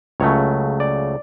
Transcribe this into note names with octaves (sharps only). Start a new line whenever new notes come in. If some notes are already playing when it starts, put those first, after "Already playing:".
C#2 C#3 F#3 A3 C#5
D5